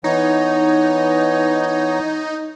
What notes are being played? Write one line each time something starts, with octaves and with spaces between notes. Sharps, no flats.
E3 B3 D#4 C#5